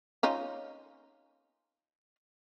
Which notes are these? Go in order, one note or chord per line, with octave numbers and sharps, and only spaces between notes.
C#4 D#4 F4